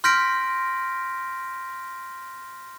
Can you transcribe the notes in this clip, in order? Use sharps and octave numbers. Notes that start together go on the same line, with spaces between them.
C6 F6 G6 A#6 B6 D7